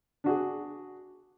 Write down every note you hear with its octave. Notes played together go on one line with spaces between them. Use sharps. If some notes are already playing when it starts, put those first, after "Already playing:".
D4 F#4 G#4